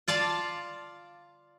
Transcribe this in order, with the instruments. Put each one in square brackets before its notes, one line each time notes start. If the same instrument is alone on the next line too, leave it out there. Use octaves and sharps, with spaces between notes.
[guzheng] F4 D5 F5 A5